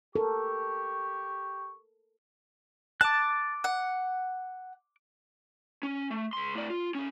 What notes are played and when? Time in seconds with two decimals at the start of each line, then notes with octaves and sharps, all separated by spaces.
0.16 G4 A4 A#4 C#6
3.01 A5 D6 F#6
3.64 F#5
5.83 C#4
6.11 A3
6.33 C#2 C6
6.55 A2 D5
6.70 F4
6.95 A#2 C#4